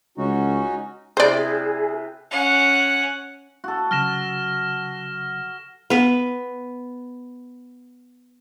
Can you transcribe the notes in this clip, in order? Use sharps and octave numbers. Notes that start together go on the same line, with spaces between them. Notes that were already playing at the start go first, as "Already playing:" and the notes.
C#2 C#4 D#4 F#4
C3 E4 G#4 B4 C5 D5
C#4 F#5
F#4 A4
C#3 F#3 F6 A#6 E7
B3 B4